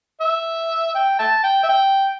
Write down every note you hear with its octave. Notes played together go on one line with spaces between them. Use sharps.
E5
G5
E5 A5
G5
E5
G5